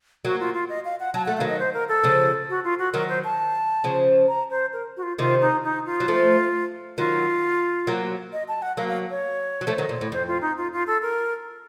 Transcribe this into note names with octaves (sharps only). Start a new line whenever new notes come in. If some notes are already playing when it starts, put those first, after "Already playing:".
F#3 A#3 F#4
F4
F4
D#5
F5
F#5
F#3 A5
A3 F#5
F5
D#3 F#3
D#5
C5
A#4
A4
C#3 F3
F#4
F4
F#4
D#3 F#3 A#4
C5
A5
C#3 F3
A#5
C5
A#4
F#4
F4
C3 D#3 F4
D#4
D#4
F4
F#3
F3 A3
D#3 F#3 F4
F#3 A#3
D#5
A5
F#5
F#3 A#3 F5
F5
C#5
F#3
F3 A3
D#3 F#3
A#2
A2
F2 C5
F4
D#4
F4
F4
A4
A#4